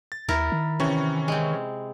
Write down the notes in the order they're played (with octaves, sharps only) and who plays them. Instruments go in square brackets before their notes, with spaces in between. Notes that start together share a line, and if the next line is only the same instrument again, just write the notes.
[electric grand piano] A6
[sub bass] D#2 [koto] E4 A#4
[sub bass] D#3
[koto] C3 [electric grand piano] E3 C#4 C#6
[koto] G#3 C4